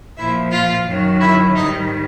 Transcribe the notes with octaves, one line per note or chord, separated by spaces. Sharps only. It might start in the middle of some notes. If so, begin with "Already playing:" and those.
A#2 F3 E4 E5
F4 F5
F#2 D#3 F#3
E4 E5
G#2 D#3 G3 D#4 D#5